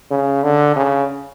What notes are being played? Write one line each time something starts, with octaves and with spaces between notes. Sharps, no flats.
C#3
D3
C#3